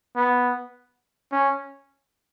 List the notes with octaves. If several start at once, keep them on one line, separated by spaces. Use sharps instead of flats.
B3
C#4